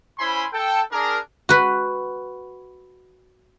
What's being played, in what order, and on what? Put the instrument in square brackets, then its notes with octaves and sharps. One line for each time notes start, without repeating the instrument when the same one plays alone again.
[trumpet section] C#4 E4 C5 G#5 B5 C6
A4 G5
D4 G#4 A#4
[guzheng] F#4 B4